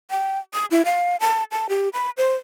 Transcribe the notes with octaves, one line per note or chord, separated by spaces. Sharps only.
G5
D#6
E4
F5
A5
A5
G4
B5
C5